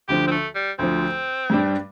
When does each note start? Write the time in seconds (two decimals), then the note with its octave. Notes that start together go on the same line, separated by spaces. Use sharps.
0.08 D2 D3 F3 G4
0.27 C4
0.31 A3
0.55 G3
0.79 D2 D3 F3 C4
1.50 G2 G3 D4